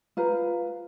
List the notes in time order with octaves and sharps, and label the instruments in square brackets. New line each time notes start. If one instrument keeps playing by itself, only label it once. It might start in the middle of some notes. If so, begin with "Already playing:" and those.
[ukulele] F4 B4 C5 A#5